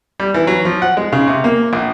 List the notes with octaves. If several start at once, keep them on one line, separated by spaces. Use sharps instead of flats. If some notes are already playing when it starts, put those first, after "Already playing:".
G3
E3
F#3
F3
F#5
G#3
C#3
C3
A#3
A#1